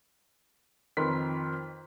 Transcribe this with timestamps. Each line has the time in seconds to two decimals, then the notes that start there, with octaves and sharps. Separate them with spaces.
0.97 F2 D#3 A#4 B4 C6 B6